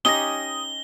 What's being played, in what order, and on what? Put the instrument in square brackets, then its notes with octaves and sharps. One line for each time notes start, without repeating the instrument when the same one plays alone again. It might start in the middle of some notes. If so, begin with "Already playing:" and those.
[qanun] C#4 D#4 G4 [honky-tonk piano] D#6 A#6 [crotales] G7